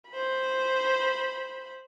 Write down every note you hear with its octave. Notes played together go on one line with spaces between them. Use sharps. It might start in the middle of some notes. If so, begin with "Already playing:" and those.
C5 B5